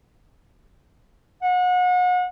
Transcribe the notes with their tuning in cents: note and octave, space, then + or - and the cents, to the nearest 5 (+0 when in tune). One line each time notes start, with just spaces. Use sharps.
F#5 -35